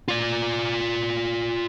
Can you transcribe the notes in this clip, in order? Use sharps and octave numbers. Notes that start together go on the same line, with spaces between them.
F4 D5